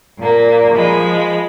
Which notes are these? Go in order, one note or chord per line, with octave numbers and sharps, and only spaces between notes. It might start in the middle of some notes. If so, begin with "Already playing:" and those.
A#2 A#3
F3 G#3 B5